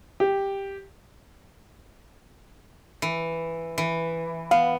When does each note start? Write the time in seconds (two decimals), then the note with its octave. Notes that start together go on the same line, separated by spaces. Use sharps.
0.20 G4
3.02 E3
3.78 E3
4.51 B3 F5